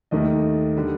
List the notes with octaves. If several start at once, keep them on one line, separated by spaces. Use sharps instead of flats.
D#2 D#3 A3 D#5
D3 G3